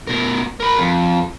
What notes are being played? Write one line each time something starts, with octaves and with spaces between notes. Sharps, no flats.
B2 A#4
A#4 B5
F2